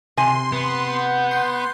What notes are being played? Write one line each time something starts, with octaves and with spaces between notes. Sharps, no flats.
C3 G#5 C6
B3
F#5 G6
C6